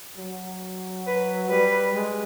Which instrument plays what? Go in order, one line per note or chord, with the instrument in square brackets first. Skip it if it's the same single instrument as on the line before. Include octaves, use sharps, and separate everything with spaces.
[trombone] F#3
[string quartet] B4
[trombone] G3 [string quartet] B4
[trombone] G#3